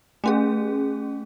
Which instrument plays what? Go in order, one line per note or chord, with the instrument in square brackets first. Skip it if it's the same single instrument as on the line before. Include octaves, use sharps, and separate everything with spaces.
[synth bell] A3 C#4 G#4